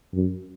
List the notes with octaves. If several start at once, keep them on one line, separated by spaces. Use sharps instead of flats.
F#2